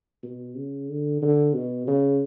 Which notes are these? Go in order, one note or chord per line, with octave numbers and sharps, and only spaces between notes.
B2
C#3
D3
D3
B2
C#3